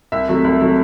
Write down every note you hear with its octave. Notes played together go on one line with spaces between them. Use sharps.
C2 E5
C3 F#3 A3
C2
C3 F#3 A3